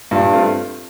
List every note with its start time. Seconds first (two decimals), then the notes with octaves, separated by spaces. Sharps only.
0.11 G2 A#2
0.33 A3 C4 F4